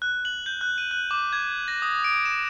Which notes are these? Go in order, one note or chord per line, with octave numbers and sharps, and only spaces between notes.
F#6
F#7
G6
F#6
D#7
F#6
D6
G#6
A#6
D#6
D7
E7